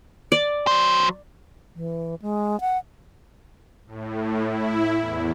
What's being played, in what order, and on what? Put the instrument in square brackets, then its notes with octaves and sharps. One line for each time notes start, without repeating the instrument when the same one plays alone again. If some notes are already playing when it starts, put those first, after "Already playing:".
[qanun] D5
[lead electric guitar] F#3 C5
[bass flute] E3
G#3
F#5
[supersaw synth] A2
E4
E2